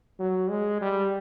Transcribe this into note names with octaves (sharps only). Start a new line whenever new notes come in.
F#3
G#3
G3